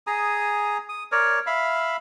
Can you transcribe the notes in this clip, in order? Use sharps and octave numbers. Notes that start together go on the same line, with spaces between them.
G#4 G#5 A#5 D#6
D#6
A#4 C#5 D5
E5 F5 B5